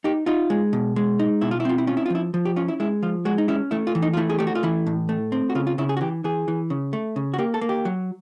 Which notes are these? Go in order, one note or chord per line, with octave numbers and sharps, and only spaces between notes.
D#4 G4
D#4 F4
G#3
B2
G#3
D#4
B2 E4
F4
E4
C4 F4
E4
C#4 F4
E4
F4
F3 E4
F3
G4
C#4 F4
E4
G#3 E4
F3 F4
G#3 F#4
D#4
C#4 E4
A3 E4
F4
E3
D#4
F4
A3 E4
G#4
A3 G4
F#4
F4
E3 E4
A2
A3
C4
F#4
C#3 F4
F4
C#3 E4
G#4
F#4
E3 G4
E3 G#4
E3
C#3
A3
C#3
F#4
A#3 G4
A4
A#3
G4
F#3